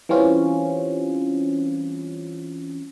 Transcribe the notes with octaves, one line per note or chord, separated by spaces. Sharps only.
E3 G3 C4 C#4 F4